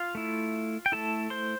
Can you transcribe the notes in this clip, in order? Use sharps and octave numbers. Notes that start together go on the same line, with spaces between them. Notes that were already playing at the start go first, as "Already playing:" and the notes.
Already playing: F4 F5
A3 E4
G5
A3 E4 A4 A5
C5 C6